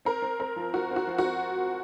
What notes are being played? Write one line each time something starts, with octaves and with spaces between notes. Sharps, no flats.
C4 A#4
C4
C4 A#4
F3
F3 F#4
C4
F#4
F3
F#4
C4